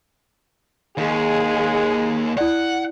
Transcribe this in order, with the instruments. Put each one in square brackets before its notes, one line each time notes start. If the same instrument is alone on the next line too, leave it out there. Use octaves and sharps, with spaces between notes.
[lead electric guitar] D#2 [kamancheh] G#3 G#4
[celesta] E4 D5 [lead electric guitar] F#5